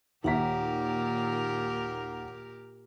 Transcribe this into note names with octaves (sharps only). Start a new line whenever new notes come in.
D#2 A#2 G4 A#4 E5 F#5 A#5 B6